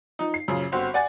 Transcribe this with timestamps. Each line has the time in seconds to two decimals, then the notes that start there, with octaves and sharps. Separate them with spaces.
0.19 F3 D#4
0.34 C7
0.48 F#2 A#2 C#3 F3
0.72 G1 C4 F#4 C6
0.94 D5 F#5 G#5 A6